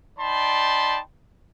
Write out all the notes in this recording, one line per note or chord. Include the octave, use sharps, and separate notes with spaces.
D#4 D5 G5 A5 B5 C6